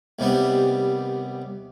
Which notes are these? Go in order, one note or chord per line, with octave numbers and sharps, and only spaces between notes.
D#2 C3 G3 B3